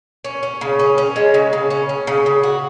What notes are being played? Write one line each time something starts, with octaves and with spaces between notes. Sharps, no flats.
C#4
C#4
C#3
C#4
C#4
G#3
C#3
C#3
C#4
C#4
C#3
C#3
F#4